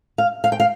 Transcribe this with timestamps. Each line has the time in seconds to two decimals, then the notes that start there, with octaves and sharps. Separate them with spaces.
0.18 F5
0.44 F5
0.52 G5
0.60 F5